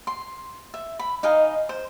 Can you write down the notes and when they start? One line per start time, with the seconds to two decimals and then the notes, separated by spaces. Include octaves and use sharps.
0.07 C6
0.74 E5
0.99 B5
1.23 D#4 D#5 F5 G#5
1.69 C5